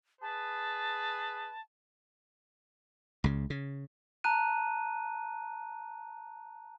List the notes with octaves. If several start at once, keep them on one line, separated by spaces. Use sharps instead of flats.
G#4 B4 A5
C#2 C#3
C#3
A5 A#5 F#6 D#7